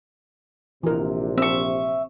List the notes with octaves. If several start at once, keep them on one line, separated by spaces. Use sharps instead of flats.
A#1 C3 E3 A#4
C4 E5 C#6